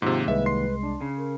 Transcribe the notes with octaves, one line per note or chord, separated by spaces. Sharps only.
D#2 G#2 C3 F4
C2 G#3 B4 E5
C6 C7
D4
C#3
A#4